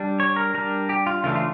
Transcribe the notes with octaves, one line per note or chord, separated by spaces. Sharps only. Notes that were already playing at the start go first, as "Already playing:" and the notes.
Already playing: G3 D4
C#5
A#4
G3 D4 A#4
G4
F4
C#3 E3 A3 D4 F4
F4